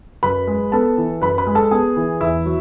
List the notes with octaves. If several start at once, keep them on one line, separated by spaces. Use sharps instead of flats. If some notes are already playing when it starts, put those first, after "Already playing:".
F#2 B4 B5
G#3
B3 A4 A5
E3
F#2 B4 B5
B4 B5
G#3
A4 A5
B3 G#4 G#5
E3
E2 E4 E5
F#3